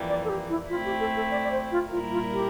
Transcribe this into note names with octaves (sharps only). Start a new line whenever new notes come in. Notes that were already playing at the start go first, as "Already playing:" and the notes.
Already playing: F2 E3 G3 A#3
D5
A4
G4
E4
A3 C4 E4 F4
G4
A4
A4
D5
D5
C5
F4
A#2 G3 A#3 E4 F4 A#4
F4
G4